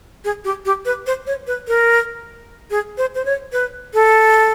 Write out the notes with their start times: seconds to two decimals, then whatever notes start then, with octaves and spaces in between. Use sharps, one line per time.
0.24 G#4
0.44 G4
0.65 G4
0.85 B4
1.07 C5
1.27 C#5
1.47 B4
1.68 A#4
2.70 G#4
2.98 C5
3.15 C5
3.25 C#5
3.52 B4
3.94 A4